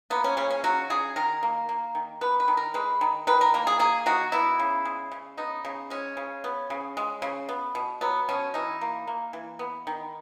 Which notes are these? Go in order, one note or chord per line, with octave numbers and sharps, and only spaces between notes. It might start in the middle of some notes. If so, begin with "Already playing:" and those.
A#3 B3
C#4
C#3 C#4
C#4
F#3 F#4
C#3 G#4
D#3 A#4
A#3
A#3
D#3
B3 B4
B4
D#3
A#4
G#3 B4
D#3
D#3 B4
A#4
A#3 A#4
G#4
A#3 G#4
D#3 F#4
B3 E4
C#3
G#3
C#3
B3 D#4
C#3
G#3 C#4
C#3
B3
C#3
G#3
C#3
B3
B2
F#3 B3
B2 C#4
E3 D#4
A#3
A#3
E3
B3
D#3